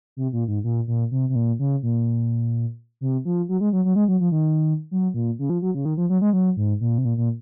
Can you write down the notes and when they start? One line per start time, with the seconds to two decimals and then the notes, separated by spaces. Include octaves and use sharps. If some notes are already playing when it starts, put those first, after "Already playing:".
0.17 C3
0.33 A#2
0.48 G#2
0.64 A#2
0.88 A#2
1.11 C3
1.29 C3
1.35 A#2
1.59 C#3
1.83 A#2
3.01 C3
3.25 F3
3.49 F#3
3.61 G#3
3.73 F#3
3.85 F#3
3.96 G#3
4.08 F#3
4.20 F3
4.32 D#3
4.91 F#3
5.14 A#2
5.39 C#3
5.50 F3
5.62 F#3
5.75 C#3
5.85 D#3
5.97 F3
6.10 F#3
6.21 G#3
6.33 F#3
6.57 G#2
6.81 A#2
6.98 C3
7.05 A#2
7.17 A#2